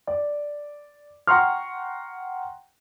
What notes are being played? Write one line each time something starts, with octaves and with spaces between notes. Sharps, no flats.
D5
F#5 G5 A#5 C6 C#6 F6